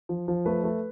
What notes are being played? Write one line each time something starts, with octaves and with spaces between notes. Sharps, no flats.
F3
F3
A3 B4
A3